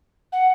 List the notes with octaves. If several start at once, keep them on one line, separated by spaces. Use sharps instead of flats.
F#5